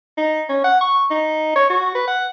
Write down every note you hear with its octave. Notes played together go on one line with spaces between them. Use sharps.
D#4
C#4
F#5
C#6
D#4
C#5
F#4
B4
F#5